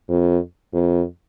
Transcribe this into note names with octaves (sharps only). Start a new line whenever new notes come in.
F2
F2